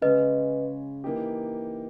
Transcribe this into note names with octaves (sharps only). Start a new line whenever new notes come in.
C#3 G#3 C#4 B4 D#5
E3 A#3 D#4 G4